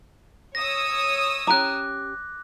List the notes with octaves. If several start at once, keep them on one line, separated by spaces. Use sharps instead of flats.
C#5 D#6 E6 A#6
C#4 G4 A#5 D6 F#6